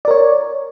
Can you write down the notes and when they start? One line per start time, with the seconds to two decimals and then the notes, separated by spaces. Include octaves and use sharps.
0.05 D5
0.08 A#4
0.11 C#5